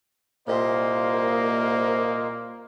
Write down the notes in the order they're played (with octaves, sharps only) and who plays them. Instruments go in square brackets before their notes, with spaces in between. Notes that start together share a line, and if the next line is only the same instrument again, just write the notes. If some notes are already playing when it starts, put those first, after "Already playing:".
[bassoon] C2 [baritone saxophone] A#2 [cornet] A#3 [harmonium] F4 C5 D#5